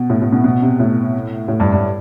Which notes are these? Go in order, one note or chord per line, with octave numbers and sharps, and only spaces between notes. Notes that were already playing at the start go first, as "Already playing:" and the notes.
Already playing: B2
A2
A2
B2
B2
C3
A2
A2
G2
G2